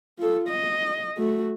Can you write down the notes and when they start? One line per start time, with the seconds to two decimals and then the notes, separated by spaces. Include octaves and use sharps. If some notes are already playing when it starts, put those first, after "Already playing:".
0.19 F4 A4
0.48 D#5
1.17 A3 F#4